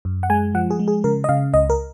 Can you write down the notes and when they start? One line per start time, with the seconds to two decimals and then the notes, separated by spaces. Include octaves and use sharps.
0.05 F#2
0.23 F#5
0.30 G#3 G#5
0.55 F3 F#5
0.70 G#4
0.79 G#3
0.88 G#4
1.04 C#3 A#4
1.24 D#5
1.29 C#3 F5
1.54 C#2 D#5
1.70 A#4